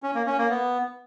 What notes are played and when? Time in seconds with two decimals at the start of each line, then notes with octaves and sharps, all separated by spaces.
0.03 C#4
0.15 A#3
0.26 C#4
0.38 A#3
0.50 B3